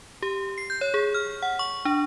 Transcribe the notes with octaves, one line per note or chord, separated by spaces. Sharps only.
G4
C7
G6
C#5
G#4
F6
F#5
C#6
D4